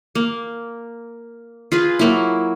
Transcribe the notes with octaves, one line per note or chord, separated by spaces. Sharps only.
A#3
F4 G#4 B4
F#3 A#3 E4